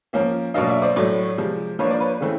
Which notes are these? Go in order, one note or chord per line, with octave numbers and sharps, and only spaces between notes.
F3 A#3 C#4
B2 F#3 A#3 D4 D#5 F5
D5 E5
C5 D5
A2 F#3 A3
C3 F3 G#3
F3 A#3 D4 B4 C#5
C5 D5
B4 C#5
C#3 E3 A3 C4